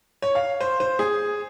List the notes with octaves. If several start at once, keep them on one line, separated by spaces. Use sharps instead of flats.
C#5
F5
C5
C5
G#4